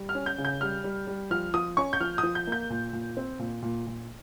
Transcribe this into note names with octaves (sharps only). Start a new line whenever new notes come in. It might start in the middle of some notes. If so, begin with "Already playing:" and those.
Already playing: G3
F6
C#4
G6
C#3
G6
G3 F6
G3
G3
F3 F6
F3 D#6
C#4 C#6
G6
F3 F6
D#6
F3
G6
A#3 G6
A#2
A#2
C4
A#2
A#2
A#2